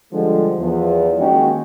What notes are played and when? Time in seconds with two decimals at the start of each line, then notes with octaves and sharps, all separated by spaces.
0.13 D3 F3 G3 G#3
0.59 E2 F3
1.18 D#3 G#3 A#3 C#4 F#4 G4